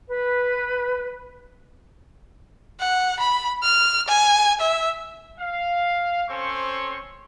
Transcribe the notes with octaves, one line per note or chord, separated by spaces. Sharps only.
B4
F#5
B5
F6
G#5
E5
F5
C4 C#4 A4 C5 C6 C#6